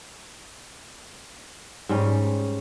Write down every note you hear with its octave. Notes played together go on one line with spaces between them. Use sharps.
G#2 G3 C#4